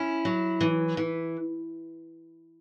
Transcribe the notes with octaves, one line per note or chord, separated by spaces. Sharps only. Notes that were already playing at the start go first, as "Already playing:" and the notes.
Already playing: C#4 E4
F#3
E3
E3